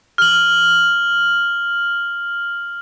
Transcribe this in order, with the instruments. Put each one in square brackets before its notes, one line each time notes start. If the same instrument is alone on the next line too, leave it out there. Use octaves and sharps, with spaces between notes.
[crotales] F6 F#7